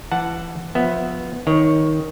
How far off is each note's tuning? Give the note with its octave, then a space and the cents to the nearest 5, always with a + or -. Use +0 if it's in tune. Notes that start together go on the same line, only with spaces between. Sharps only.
E3 +25 F#5 +0 A5 +0
F3 +20 B3 +0 E5 +0
D#3 +15 C#5 +0